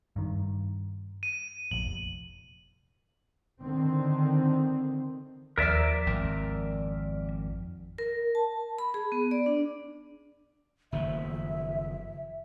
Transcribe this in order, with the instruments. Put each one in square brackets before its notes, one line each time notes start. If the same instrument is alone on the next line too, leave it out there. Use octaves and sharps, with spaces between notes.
[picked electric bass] G2 D#3
[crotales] D#7
[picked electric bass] F1 A#1 [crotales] F#7
[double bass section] D3 D#3 C4
[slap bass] D#2 F3 [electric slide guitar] A#4 D5 E5
[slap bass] G#1 F2
[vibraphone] A#4
A5
B5
G#4
B3
D5
D4
[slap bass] F#1 D#3 F3 [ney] E5